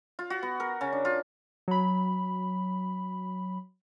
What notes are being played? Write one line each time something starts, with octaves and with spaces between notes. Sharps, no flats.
F4
F#4
B3
A#4
C#3
D4
F4
F#3 B5